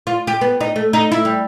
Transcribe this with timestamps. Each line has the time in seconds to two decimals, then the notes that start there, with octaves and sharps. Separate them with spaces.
0.07 F4
0.27 G4
0.41 B3
0.61 D#4
0.76 A3
0.93 D#4
1.12 E4
1.25 G3